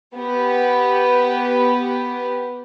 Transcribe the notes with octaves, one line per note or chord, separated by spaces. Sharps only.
B3 G4 B4